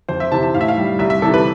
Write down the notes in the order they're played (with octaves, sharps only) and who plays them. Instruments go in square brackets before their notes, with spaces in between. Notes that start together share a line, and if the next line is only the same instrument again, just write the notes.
[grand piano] F2 C5
E5
C3 E3 A5
A5
A2 F5
E5
F5
G3
C2 E5
E5
C3 E3 A4
B4